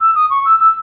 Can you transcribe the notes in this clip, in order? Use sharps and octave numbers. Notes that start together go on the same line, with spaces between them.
E6
D#6
C#6
E6
E6